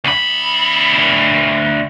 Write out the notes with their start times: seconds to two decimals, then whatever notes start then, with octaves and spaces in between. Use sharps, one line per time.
0.04 D2 B5